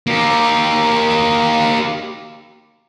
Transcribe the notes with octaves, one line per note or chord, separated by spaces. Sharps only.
A#3 G4